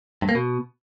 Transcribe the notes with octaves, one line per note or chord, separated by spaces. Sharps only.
G2
A#3
B2